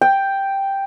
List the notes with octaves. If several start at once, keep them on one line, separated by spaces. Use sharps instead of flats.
G5